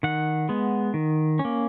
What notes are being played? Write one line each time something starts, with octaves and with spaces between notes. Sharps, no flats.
D#3 F#5
G#3 B3
D#3
C#4
A#3